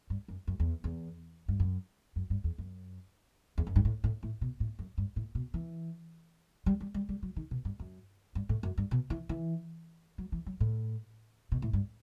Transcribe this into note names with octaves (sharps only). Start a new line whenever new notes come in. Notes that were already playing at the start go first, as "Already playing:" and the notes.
G2
F#2
F#2
E2
E2
G2
F#2
F#2
G2
E2
F#2
E2
F#2
G2
A2
A2
A2
B2
A2
F#2
G2
A2
B2
E3
G3
G3
G3
G3
F#3
D#3
B2
G2
F#2
G2
A2
F#2
G2
B2
E3
E3
F#3
E3
F#3
A2
B2
A2
G2